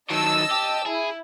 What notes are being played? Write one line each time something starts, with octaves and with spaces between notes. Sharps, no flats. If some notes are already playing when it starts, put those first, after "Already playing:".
D#3 F#3 D#5 A5 E6
G4
E4 G#4